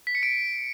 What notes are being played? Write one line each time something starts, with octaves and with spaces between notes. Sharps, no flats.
B6
C#7
D7